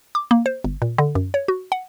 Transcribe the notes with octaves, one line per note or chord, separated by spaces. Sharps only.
D6
A#3
C5
G1
A#2
D3
F#2
C#5
F#4
F#5